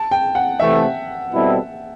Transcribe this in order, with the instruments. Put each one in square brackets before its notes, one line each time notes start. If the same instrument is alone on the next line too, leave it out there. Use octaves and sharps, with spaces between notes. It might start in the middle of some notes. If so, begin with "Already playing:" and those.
Already playing: [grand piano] A5
G5
F#5
[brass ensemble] C3 E3 A3 [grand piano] E5
[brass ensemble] B2 G3 C4 E4 A4